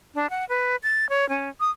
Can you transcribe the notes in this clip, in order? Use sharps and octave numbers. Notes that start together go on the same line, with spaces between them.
D4
F#5
B4
A6
C#5
C#4
D#6